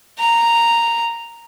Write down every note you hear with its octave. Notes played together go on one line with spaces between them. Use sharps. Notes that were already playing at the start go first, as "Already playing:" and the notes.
A#5